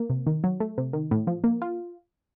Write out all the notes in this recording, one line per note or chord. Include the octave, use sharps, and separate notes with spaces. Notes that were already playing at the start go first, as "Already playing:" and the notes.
Already playing: A#3
C3
D#3
F#3
A3
C3
D#3
A2
F3
A#3
F4